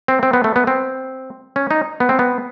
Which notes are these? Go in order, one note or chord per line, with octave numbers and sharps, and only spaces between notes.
C4
C4
B3
A3
B3
C4
C#4
D#4
B3
C4
B3